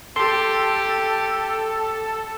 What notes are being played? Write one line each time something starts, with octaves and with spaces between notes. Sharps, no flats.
G4 A4 C6